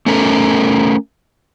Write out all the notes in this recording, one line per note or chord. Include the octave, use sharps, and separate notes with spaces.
A3 C#4 A4 A#4